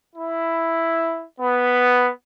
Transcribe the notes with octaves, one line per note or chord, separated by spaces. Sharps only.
E4
B3